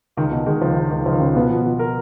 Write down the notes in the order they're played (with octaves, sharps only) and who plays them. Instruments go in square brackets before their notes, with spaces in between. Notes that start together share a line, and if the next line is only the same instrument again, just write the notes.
[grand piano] C#2 [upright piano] D#3
[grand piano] B2
[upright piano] D#3 [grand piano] G#3
[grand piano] C#2 [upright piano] F3
[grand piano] C#2 [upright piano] D#3
[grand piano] C#2 [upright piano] D#3
[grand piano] C#2 [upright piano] F3
[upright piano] D#3
[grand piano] C#2 [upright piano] C#3
[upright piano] B2 [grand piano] B3
[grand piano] F3
F3
A#4